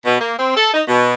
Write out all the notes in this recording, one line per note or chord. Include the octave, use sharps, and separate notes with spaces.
B2
A#3
C4
A4
D#4
B2